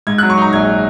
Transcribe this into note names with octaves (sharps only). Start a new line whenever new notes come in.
G#2 G#6
F#6
F#3
C#6
D#4 A#5
A#1 G#6